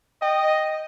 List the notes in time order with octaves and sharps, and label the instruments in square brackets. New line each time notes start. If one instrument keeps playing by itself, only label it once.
[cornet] D#5 [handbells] G5